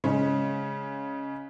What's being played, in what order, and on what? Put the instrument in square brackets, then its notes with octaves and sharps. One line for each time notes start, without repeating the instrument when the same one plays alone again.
[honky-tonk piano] C#3 G#3 C#4